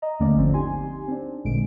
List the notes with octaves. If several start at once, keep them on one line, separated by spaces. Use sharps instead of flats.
D#5 A#5
D#2 D3 A3 A#3 C#4 D5
G#1 D3 F3 C4
D#4 G4 G#5 C6
C4 D4
A1 A#2 D3 G#3 D7